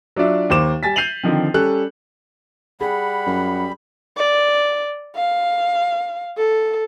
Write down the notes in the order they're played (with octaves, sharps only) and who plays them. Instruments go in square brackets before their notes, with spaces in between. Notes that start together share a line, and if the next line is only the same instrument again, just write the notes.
[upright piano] F#3 D4 F4 D5 E5
D#2 A#3 C5 D6 E7
G3 G#5 A6 B6
G6 C7 D#7 F7 F#7
D3 D#3 F3 C4
G3 C#4 A4 F#6
[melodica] G3 B5 [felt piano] G#4 [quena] F#5
[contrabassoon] F#2
[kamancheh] D5
F5
A4